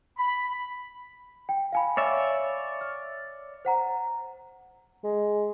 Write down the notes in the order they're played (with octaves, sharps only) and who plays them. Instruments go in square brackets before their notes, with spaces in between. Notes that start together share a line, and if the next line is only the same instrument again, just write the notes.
[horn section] B5
[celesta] G5
F5 G#5 B5
[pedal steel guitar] C#5 D5 E5
[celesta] F6
C5 F#5 A#5
[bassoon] G#3